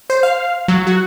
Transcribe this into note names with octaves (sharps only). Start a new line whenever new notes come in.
C5
F5
F#3
F#4